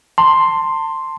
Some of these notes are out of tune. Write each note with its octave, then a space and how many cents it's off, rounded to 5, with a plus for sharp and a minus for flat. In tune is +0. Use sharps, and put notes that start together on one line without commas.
A5 +35 C6 +5